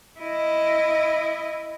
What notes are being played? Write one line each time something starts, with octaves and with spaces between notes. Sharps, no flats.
E4 D#5